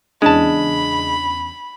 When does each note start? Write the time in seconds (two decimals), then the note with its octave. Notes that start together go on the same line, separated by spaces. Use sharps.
0.22 E2 C#3 G#3 D4 A5 B5